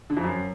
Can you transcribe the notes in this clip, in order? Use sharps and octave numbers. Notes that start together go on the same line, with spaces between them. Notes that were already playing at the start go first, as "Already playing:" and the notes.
D3
F2
F#2